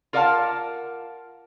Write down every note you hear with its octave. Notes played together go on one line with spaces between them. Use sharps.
F4 A#4 D5 F5 F#5 A5